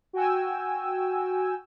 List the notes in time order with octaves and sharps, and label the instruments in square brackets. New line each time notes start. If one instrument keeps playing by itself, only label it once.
[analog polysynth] F#4 G5 G#5 E6